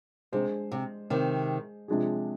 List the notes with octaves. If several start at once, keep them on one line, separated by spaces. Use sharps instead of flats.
C3 G#3 D4 G#4 C5
C3
C3 D#3
C3 F3 G#3 D4 G#4